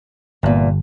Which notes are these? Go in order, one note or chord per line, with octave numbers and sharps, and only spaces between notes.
G1 E2 A#2